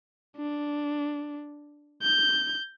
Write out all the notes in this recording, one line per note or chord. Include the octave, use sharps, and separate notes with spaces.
D4
G6